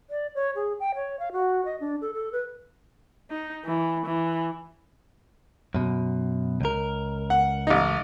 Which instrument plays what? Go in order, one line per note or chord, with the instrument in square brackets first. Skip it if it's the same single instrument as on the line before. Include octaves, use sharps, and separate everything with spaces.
[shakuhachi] D5
C#5
G#4
G5
C#5
F5
F#4
D#5
D4
A4
A4
B4
[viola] D#4
E3
E3
[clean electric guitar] F#2 B2
C#2 A#4
[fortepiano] F#5
A1 D#4